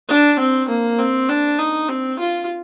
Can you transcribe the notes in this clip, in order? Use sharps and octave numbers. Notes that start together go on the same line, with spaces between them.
D4
C4
A#3
C4
D4
D#4
C4
F4